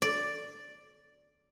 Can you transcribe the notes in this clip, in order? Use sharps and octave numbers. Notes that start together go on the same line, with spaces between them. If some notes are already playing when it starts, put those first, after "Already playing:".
D5